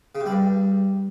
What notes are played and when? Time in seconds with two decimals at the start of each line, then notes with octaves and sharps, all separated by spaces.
0.15 C#3
0.20 C3
0.26 G3
0.32 G2